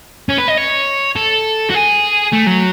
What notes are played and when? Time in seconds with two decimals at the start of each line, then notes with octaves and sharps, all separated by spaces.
0.29 C#4
0.38 B4
0.48 D#5
0.58 C#5
1.16 A4
1.70 F#4
1.74 G#4
2.33 A3
2.47 F#3